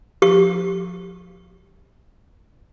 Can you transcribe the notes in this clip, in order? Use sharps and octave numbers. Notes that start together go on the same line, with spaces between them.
G4 C#6